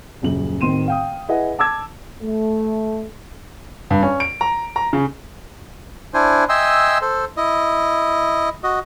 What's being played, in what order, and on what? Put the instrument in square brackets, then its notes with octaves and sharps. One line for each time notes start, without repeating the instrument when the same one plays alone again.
[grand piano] D#1 F#2 C#3 F#7
D1 D#3 C4 C6 D#7 E7
F5 G5 D#6
E4 G#4 B4 D#5 F#5
A5 D6 E6 G#6
[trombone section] A3
[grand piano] G2
C#4
D7
A#5
A#5
C#3
[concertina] D4 E4 C5 G#5
D#5 E5 G5 G#5 C6 E6
A4 C5
E4 D#5
F#4 D#5